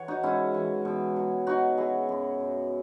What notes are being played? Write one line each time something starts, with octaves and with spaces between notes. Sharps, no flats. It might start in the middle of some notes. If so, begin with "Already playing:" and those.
Already playing: E3 C#5 F#5
D#4 F#4
G#2 C#4 E4
E3
B2
F#3
F#3 D#4 F#4
F#3 E4 G#4
F#2
F#2